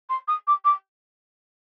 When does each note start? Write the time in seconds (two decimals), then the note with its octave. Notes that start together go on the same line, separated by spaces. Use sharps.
0.09 C6
0.27 D#6
0.47 D6
0.64 D6